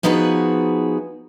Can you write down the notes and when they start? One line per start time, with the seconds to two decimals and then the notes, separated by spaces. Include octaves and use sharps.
0.03 F3 B3 D#4 F#4 G#4 B4